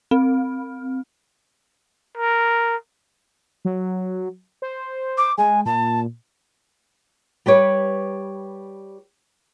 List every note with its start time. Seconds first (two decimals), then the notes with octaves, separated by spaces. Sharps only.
0.11 C4
2.18 A#4
3.65 F#3
4.62 C5
5.17 D6
5.38 G#3 G#5
5.66 A#2 A5
7.46 G3 G4 B4 C#5